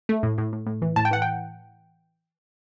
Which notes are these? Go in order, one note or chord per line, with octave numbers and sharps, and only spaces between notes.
A3
A2
A2
A2
A2
E3
A2 A5
G5
E3 F#5
G5